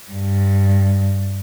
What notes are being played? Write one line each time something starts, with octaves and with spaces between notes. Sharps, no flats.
G2